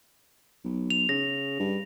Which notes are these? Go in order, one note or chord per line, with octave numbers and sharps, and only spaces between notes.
B1
F7
C#3 A#6
G2